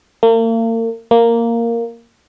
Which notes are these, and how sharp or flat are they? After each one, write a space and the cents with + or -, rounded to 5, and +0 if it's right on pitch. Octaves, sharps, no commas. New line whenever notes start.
A#3 -40
A#3 -5